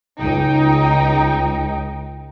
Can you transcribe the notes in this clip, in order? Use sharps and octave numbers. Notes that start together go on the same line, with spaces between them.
C#2 D#4 G5